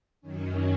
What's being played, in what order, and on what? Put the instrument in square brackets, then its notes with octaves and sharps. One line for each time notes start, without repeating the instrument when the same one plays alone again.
[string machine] F#2 D#3 F#3 C#4